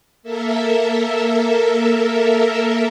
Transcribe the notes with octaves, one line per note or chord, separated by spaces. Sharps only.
A#3 A4 A#4 E5